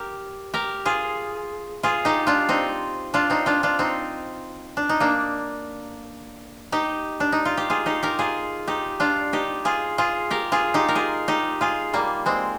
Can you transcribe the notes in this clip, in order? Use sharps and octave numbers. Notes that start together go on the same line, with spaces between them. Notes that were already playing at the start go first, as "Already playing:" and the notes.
Already playing: G4 A#4
G4 A#4
F4 G#4
F4 G#4
D#4 G4
D4 F4
C4 D#4
D4 F4
C4 D#4
D4 F4
D4 F4
C4 D#4
D4
D#4
A#3 D4
D#4 G4
D4
D#4
F4
G4
F4 G#4
D#4 G4
G4 A#4
F4 G#4
D#4 G4
D4 F4
D#4 G4
F4 G#4
F4 G#4
G4 A#4
F4 G#4
D#4 G4
A#4
F4 G#4
D#4 G4
F4 G#4
G3 A#3
G#3 C4